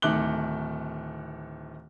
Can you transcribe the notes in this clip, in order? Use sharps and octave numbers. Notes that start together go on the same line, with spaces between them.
D1 D#3 A3 D6 F#6 G7